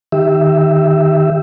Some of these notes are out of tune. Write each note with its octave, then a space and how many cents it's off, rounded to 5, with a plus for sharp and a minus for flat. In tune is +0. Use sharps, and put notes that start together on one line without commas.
D#3 +0 G4 +0 E5 +0